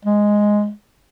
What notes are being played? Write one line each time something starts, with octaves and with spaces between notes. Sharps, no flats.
G#3